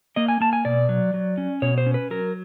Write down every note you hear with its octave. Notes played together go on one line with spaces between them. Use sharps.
A#3 D#5
G#5
A#3 A5
G#5
B2 D5
F#3
F#3
C#4
B2 C#5
C5
C#4
B4
F#3 A#4